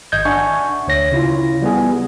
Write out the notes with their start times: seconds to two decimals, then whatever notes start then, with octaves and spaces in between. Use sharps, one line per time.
0.12 G#1 D#5 G6 G#6
0.25 D4 E5 F#5 G#5 C#6
0.87 D2 C#5 A#6
1.12 C#3 E4 F4
1.62 G3 B3 G#4